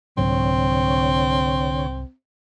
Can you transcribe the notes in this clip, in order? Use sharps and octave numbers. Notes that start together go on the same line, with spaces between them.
C2 G#2 D3 F#3 C4 C#5